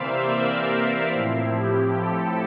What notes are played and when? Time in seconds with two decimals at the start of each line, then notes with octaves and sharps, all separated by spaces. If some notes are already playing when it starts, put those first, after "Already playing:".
Already playing: C3 E3 A#3 C5 D5 E5 F5
0.28 A#4 D5
0.69 A#4 D5
1.13 A2 F3 C4 E4
1.55 G4
1.97 A4